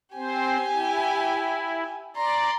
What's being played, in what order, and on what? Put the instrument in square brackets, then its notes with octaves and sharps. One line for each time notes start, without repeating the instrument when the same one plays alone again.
[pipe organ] C4 C5 [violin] G4 G#5
[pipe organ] E4
[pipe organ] D5 [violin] A#5 C6